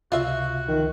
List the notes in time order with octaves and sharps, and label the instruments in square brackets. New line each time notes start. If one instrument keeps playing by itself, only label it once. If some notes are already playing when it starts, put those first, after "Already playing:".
[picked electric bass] C#2 C3 [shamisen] F4 E5 [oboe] F#4
[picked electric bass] C#2 F3 [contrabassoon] D#3